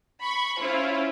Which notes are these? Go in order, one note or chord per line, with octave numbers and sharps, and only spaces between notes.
B5 C#6
C#4 E4 F4 C5